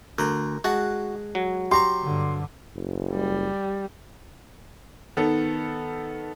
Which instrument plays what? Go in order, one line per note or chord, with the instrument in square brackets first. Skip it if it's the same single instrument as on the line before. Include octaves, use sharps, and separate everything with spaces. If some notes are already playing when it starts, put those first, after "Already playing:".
[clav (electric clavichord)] D2 [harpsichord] A#4 C6
[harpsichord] G#3 F#5 A5 [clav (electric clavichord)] F#4
[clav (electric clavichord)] F#3
[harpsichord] G4 A#5 C#6 [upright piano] C6
[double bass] G2 D3
[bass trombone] F#1
[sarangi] G3
[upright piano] D#3 B3 A4